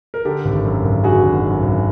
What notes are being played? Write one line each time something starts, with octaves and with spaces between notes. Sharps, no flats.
A#4
D3 G4 A4
G#1
F#2
G#1
D3 F#4 G#4
G#1
F#2
G#1